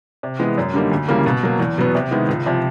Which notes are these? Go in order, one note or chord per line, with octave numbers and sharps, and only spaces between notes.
C3
E3 G#3 B3
F#2
D3 G3 A#3 D#4
D2
C#3 E3 G3 A#3
B2
F#3 A#3
E2
B2 F#3 B3
C3
D#3 G#3 B3 E4
C#2
C3 F3